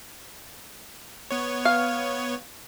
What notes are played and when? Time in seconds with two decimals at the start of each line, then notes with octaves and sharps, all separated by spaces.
1.31 B3 C#5
1.65 F5